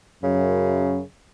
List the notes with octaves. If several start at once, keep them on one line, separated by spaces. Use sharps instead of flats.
F#2 C#3